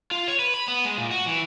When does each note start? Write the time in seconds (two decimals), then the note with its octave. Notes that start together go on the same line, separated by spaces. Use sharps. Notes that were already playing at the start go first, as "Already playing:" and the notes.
0.11 F4
0.28 C#5
0.39 B4
0.54 B5
0.68 B3
0.85 G#3
0.97 A#2
1.11 F#4
1.27 E3